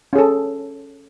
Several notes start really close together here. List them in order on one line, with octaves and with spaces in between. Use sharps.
C#4 G#4 A4